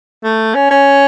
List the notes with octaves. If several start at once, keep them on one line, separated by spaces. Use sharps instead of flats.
A3
C#4
C#4